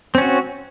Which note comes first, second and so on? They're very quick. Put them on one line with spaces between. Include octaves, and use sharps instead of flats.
C4 C#4 F#4